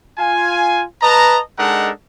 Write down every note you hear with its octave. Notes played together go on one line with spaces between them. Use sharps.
F4 G#5
B4 D#5 A5 A#5
G#3 D4 D#4 A4 A#4 F#5